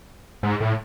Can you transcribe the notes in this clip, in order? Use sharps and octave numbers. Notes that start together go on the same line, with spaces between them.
G#2
A2